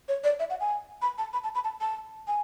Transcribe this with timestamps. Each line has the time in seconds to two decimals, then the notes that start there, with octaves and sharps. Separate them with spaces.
0.09 C#5
0.24 D5
0.40 E5
0.50 F#5
0.61 G#5
1.02 B5
1.18 A5
1.33 B5
1.44 A5
1.55 B5
1.64 A5
1.81 A5
2.27 G#5